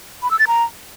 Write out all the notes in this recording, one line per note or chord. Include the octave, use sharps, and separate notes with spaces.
B5
E6
A6
A#5